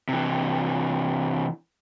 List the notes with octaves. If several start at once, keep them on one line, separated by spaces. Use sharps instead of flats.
C3 E3